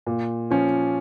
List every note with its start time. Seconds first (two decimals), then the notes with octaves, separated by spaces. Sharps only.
0.07 A#2
0.50 F3 C#4 F4